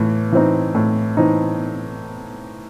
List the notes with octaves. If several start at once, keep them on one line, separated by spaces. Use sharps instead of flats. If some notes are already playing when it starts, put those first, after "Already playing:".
Already playing: A2 E3
E3 C4 D#4
A2
E3 C4 D#4